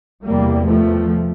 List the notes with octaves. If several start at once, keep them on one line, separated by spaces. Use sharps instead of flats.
E2 C3 G3 A#3
F3 A3